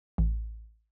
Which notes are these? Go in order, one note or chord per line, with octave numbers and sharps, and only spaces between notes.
A1